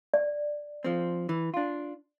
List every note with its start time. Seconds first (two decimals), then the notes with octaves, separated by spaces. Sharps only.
0.14 D5
0.84 F3 C4
1.29 E3
1.54 D4 F4